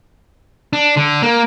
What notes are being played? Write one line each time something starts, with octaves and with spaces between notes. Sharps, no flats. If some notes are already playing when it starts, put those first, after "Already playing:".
D4
D3
A#3